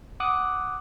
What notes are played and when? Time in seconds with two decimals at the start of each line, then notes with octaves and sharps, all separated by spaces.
0.20 F#5 D6 D#6 F#6